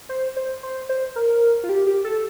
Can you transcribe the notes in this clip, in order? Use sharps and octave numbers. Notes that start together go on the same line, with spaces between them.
C5
C5
C5
C5
A#4
F4
G4
G4
A4